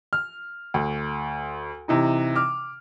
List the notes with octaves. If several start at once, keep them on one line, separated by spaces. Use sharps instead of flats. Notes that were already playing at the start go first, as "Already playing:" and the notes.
F6
D2
C3 E3 D#4
D6 F6